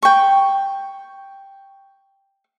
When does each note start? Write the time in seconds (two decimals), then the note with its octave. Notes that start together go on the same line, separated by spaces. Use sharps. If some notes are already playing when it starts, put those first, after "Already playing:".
0.03 G5 C#6